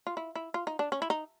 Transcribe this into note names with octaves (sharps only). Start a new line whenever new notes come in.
F4
E4
E4
F4
D#4
D4
C#4
E4
D#4